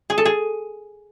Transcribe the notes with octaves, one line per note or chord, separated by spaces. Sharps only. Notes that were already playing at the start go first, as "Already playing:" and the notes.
G#4
A4
G#4